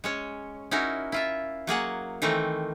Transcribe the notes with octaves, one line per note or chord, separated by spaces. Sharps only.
G#3 C#4 C#5
C#4 D#4 E4 F#4 A#4
E4 F4 E5
F#3 A#3 G#4 F#5
D#3 E3 A3 C4 A#4